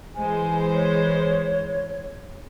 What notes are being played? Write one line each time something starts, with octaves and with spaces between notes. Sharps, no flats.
E3 G#3 C5 G#5
C#5